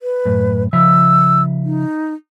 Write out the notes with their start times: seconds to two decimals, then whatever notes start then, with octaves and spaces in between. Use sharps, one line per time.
0.02 B4
0.25 F#2 A2
0.73 C#3 F3 E5 E6
1.64 D#4